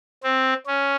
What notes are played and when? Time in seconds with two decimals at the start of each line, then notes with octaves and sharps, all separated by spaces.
0.23 C4
0.67 C#4